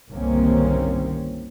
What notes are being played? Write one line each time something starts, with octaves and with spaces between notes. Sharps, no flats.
G1 C2 D#3 A#3 C4 C#4